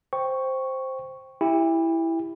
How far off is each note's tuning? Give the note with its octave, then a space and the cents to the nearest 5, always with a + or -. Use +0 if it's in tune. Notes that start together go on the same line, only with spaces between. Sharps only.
C5 +0 G5 +0 C#6 +0
E4 +0 G4 +0 G5 +40